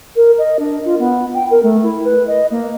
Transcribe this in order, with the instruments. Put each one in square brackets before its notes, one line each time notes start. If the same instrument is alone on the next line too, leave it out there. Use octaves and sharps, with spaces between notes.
[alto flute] A#4
D#5
D4
F4
B3
G5
A#4
A3
E4
B4
D#5
A#3